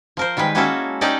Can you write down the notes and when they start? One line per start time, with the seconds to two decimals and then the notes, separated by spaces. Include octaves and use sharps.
0.17 F3 A#4 C5
0.37 D#3 G3 G#3 B4
0.55 G#3 A#3 C#4 E4 F#4 A4
1.01 C#4 D#4 G4 A4 D5 D#5